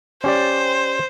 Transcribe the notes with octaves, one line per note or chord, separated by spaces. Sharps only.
C#4 G4 C5 D5